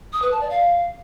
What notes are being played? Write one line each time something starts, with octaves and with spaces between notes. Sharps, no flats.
D#6
B4
A5
D5
F5